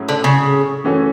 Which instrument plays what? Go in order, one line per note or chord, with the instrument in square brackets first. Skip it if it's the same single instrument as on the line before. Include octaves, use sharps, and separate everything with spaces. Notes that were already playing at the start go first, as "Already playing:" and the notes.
Already playing: [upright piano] A2 F#3 C#4 E4 G#4
[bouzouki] D3
C#3
[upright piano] E3 A3 C#4 F#4 A4